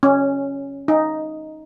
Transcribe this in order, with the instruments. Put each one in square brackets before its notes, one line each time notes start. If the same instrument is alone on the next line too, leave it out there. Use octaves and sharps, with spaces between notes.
[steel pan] C#4
D#4